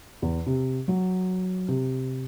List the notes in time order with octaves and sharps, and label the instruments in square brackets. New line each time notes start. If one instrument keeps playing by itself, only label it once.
[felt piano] E2
C3
F#3
C3